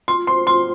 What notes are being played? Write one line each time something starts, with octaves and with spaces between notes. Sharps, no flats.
F4 C6
C5 C6
F4 C6